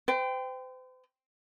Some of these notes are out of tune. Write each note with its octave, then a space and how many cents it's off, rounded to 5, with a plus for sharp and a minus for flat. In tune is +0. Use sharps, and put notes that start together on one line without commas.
C5 -40 G5 +5